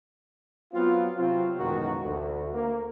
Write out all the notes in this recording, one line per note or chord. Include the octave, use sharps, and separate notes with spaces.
F#3 B3 C4 F4
C3 F#3 C4 F4
A1 F#2 B2 D#3 G#3 F#4
D2
A#3